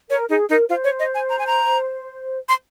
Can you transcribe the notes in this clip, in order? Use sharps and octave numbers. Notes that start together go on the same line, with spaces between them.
A#4 C#5
D#4 G#4
D#4 A#4
F4 C5
C#5
D#5
G#5
A#5
G#5
A#5
C6